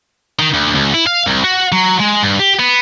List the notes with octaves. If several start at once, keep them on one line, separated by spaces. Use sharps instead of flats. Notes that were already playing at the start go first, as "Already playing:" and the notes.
D#3
D2
C#2
E4
F5
C2
F#4
F#3
G#3
G2
G4
B3